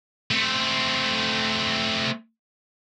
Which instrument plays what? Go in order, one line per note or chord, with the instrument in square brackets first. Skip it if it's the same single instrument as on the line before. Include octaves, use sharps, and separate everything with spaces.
[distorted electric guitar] A3 C4